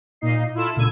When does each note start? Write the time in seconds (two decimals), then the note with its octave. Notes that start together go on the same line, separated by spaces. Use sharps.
0.21 A#2 A#3 D#4 D#5 C7
0.55 E4 F4 A4 E7
0.76 C#2 A#2 D3 E6 G#6 D#7